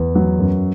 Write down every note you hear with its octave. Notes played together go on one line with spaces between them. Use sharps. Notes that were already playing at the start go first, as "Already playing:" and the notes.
Already playing: E2
F#3
F#2